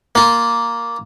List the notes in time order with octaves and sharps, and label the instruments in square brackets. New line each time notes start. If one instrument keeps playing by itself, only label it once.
[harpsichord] A#3 F4